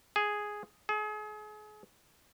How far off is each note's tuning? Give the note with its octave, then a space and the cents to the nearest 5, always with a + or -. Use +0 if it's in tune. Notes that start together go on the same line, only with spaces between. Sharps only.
G#4 +0
G#4 +35